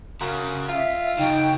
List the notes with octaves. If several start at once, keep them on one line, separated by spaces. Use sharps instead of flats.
F#2 C#3
F4 E5
C#3 F#3 D#4 G5